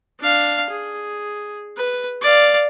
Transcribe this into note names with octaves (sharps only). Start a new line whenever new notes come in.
D4 F5
G#4
B4
D5 F5